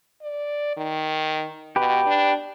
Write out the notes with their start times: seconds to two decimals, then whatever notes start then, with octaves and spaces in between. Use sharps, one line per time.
0.22 D5
0.77 D#3
1.76 B2 G4 B4
2.06 D4